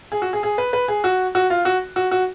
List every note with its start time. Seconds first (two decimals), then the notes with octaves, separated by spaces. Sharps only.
0.12 G#4
0.22 F#4
0.33 G#4
0.43 G#4
0.58 B4
0.73 B4
0.88 G#4
1.04 F#4
1.35 F#4
1.50 F4
1.65 F#4
1.96 F#4
2.11 F#4